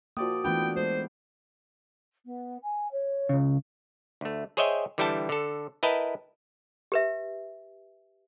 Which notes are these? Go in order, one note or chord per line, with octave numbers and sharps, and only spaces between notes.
F3 A#3 F#4 D5 G5 D#6
E3 A3 B3 D4 G5
G#3 A4 C5
B3
G#5
C#5
C#2 C#3
D2 A3
G#4 C5 C#5 D#5 E5 G5
D3 E3 G3 E4 G5 A5
D3 A4
E4 A#4 B4 D#5 G5 A5
G4 B4 E5